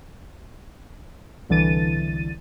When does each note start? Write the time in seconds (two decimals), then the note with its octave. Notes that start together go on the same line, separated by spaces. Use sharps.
1.49 C2 D3 E3 D4 A6 D#7